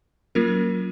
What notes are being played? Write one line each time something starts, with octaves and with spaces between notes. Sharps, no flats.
F#3 A#3 C#4 F4 A#4